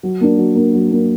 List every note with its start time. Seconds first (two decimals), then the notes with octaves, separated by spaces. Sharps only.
0.03 F#3
0.21 A#3 D4
0.38 F#3
0.55 A#3 D4
0.73 F#3
0.91 A#3 D4